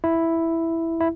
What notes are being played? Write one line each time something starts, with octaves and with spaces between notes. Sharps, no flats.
E4
E4